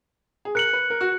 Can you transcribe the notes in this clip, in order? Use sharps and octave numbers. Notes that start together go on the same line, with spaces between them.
G#4
A#4 F#6 C#7 F#7
B4
A#4
F#4